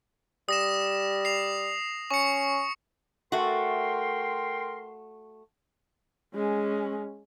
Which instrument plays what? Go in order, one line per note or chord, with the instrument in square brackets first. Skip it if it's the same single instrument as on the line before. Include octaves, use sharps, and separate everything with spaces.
[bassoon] G3 [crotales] D#6 A#6 E7
[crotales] C7 F7
[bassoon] C#4 [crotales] C#6 C#7
[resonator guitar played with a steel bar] A3 F#4 [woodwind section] A#4 G5 C6
[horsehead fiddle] G#3 C#4